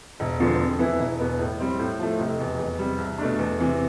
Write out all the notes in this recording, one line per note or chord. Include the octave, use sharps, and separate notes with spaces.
E1
E2 D3 F3
F2
E3 B3 E4
E1
E2 B2 B3
A2
G3 C4
A2
F3 A3
F1
E2 B2
E2
C3 G3
C2
B2 A3 D4
E2
C3 E3